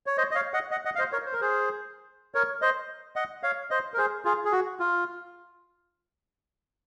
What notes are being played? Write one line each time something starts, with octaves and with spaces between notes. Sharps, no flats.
C#5
C5 D#5
D#5
C#5 F5
D#5 F#5
D#5 F#5
D#5 F#5
F5
C5 D#5
A#4 C#5
C5
A#4
G#4 C5
A#4 C#5
C5 D#5
D#5 F#5
C#5 F5
C5 D#5
A#4
G#4 C5
F4 G#4
G#4
F#4
F4